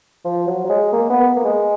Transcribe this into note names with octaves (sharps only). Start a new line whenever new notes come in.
F3
F#3
F#3
G#3
A#3
B3
A#3
G#3